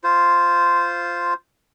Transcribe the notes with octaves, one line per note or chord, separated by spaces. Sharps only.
F4 C5